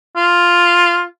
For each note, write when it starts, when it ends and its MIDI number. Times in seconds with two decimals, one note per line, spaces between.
0.16 1.04 65